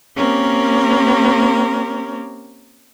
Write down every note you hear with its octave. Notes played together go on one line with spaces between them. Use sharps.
A#3 C4 C#4 G4 A#4